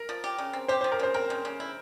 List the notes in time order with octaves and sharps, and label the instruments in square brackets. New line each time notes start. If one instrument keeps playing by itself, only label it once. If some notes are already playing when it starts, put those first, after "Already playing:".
Already playing: [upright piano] A#4
[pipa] F3
G4
C#3
C4
[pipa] G4 [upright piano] C5
[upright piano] C5
[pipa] F3
[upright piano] A#4
[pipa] C#3 [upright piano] C5
[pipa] C4 [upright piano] A#4
[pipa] C#3
C#3
E4